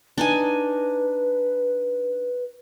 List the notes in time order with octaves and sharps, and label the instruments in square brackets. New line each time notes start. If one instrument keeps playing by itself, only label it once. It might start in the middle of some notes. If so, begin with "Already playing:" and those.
[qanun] D4 D#4 G#5 [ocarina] B4